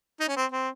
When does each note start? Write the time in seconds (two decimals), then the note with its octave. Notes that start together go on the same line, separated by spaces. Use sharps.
0.20 D#4
0.28 C#4
0.37 C4
0.52 C4